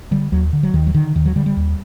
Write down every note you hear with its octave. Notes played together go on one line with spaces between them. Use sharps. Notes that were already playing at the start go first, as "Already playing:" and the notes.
D3 G3
D#2 F#3
D3
F#3
D#2 D#3
F#3
D3 D#3
D#2 D#3
F#3
D3 G3
G3
D#2